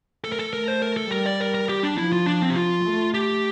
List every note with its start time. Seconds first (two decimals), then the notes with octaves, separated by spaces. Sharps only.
0.24 A3 A4
0.32 A#4
0.39 A4
0.53 A3 A#4
0.68 C5
0.82 A#4
0.97 A4
1.11 G3 A#4
1.26 D5
1.41 A#4
1.54 A#4
1.69 G4
1.83 D4
1.98 F3 E4
2.12 F4
2.27 D4
2.42 C4
2.50 G4
2.56 F4
2.85 A3
3.14 G4